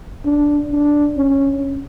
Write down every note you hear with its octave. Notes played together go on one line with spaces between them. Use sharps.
D4
D4
C#4